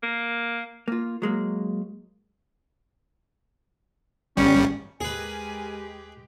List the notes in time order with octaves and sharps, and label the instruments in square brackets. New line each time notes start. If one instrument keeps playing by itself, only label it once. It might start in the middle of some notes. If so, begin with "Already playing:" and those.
[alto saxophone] A#3
[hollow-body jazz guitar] A#3 F4
F#3 G#3 A#3
[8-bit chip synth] G1 G3 [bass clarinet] C#4
[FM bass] D#2 [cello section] G#3 G4 [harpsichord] G#4 B4 [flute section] A#4 G#5